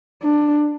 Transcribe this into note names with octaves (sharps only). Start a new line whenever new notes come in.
D4